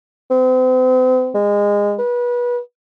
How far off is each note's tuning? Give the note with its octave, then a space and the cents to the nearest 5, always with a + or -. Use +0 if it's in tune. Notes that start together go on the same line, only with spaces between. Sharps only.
C4 -40
G#3 -25
B4 -25